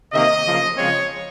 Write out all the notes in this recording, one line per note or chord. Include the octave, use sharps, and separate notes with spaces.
C3 D#3 A#3 D#5
C#3 F3 A#3
C#3 F3 G#3 C4 C#5